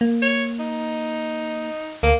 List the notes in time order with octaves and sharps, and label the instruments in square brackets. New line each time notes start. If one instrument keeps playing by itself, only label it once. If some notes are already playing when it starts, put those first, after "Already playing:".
[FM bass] A#3
[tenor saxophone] C#5
D#4
[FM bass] D2 [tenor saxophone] A#3